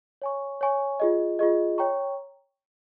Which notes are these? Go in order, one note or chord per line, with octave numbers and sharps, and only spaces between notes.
C#5 G#5 C#6
C#5 G#5 C#6
F4 G#4 D#5
F4 G#4 D#5
C#5 G5 A#5 C#6